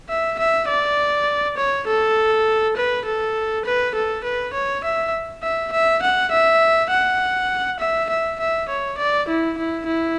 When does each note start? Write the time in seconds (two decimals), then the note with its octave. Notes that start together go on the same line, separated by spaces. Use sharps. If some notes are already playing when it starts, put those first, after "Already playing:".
0.09 E5
0.39 E5
0.68 D5
1.57 C#5
1.87 A4
2.76 B4
3.05 A4
3.65 B4
3.95 A4
4.24 B4
4.53 C#5
4.84 E5
5.43 E5
5.72 E5
6.02 F#5
6.31 E5
6.90 F#5
7.80 E5
8.10 E5
8.40 E5
8.69 C#5
8.98 D5
9.28 E4
9.58 E4
9.87 E4